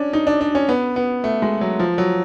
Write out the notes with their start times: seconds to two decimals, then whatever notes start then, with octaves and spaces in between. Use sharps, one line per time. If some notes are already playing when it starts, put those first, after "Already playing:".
Already playing: C#4 D4
0.13 D#4
0.27 D4
0.41 D4
0.55 C#4
0.69 B3
0.96 B3
1.24 A3
1.42 G#3
1.61 F#3
1.80 F3
1.98 F#3